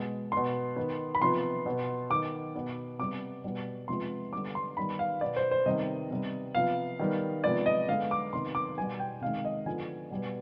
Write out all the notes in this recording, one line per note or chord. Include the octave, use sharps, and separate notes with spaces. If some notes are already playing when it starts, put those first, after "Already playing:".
Already playing: B2 G#3 B3
B2 B3 C6
D#3 B3
B5
C3 F3 B3 C6
B2 B3
D#3 B3 D6
B2 B3
C3 G3 B3 D6
B2 G3 B3
C3 F3 G#3 B3 C6
D3 G3 B3 D6
C6
D#3 G3 B3 B5
F5
B2 B3 D5
C5
C5
C3 D#3 G3 B3 D#5
C3 G3 B3
C3 F3 B3 F5
D#3 G3 B3
C3 F3 G#3 B3 D5
D#5
D3 G#3 B3 F5
D6
C3 D#3 B3 C6
D6
B2 G3 B3 G#5
G5
C3 D#3 G#3 F5
D#5
D3 F3 B3 G#5
B2 G3 B3